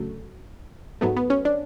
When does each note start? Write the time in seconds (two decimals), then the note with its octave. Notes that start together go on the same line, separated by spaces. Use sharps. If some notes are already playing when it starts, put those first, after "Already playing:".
Already playing: D2 C#3 F#3 A3
1.01 G#2 F#3 A3 B3
1.17 B3
1.30 C#4
1.45 D4